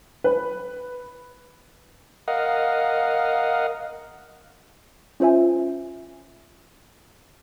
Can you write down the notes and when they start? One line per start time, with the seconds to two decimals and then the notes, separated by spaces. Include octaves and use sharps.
0.24 B4
2.28 A#4 D#5 F5 F#5
5.20 C#4 F4 C5 E5 G#5